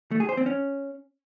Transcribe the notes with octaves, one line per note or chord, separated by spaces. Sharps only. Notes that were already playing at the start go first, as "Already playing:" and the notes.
A3
G#4
C5
C4
C#4